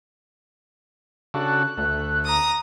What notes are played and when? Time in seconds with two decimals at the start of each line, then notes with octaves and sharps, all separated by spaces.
1.34 C#3 D4 F#4 A4 F#6
1.77 D2 A3
2.25 A#5 D#6